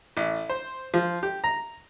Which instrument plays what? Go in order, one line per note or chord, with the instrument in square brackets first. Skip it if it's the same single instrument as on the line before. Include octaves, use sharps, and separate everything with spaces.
[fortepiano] A1
C5
F3
G4
A#5